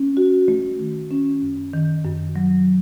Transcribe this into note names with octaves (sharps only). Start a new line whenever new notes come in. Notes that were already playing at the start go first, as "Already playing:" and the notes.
Already playing: C#4
F#4
A3
D#3
C#4
F#2
D#3
F#2
F#3